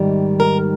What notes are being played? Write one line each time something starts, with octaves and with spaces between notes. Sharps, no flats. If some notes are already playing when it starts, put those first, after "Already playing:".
Already playing: G#2 D#3 G3 A#3
A#4